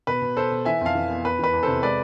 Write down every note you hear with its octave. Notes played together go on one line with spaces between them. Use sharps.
B2 B4
B2
B2 A4 C5
B2
E3 E5 G#5
F2 F5 A5
E3
B3
E2 B4
E3 B4
E2
C3 A4 C5
G#3 B4 D5